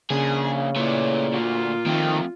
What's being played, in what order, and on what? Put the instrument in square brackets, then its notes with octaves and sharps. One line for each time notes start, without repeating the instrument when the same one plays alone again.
[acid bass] C#3 [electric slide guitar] A#3 D4 [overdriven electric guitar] G#4
[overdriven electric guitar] A#2 [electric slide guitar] A3 B4 C#5 [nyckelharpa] E4 D5
[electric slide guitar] D3 F#4 [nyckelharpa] F4
[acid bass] D#3 [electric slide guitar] F3 A3 C4 [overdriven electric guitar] A#3 G5